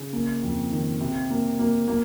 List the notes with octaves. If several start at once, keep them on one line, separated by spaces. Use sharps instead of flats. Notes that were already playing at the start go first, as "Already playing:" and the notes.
Already playing: C#3
A#3
F2
D#3
C3
A#3
A#3
A#3